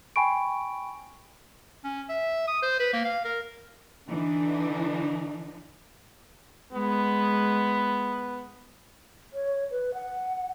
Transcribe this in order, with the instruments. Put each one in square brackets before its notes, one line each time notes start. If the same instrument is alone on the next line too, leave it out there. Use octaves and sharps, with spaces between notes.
[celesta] G5 G#5 B5 C#6 D7
[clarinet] C#4
E5
D#6
C5
B4
A#3
F5
A#4
[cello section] D3 E3 D4 D#4
[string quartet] G#3 [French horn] B3
[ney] C#5
B4
F#5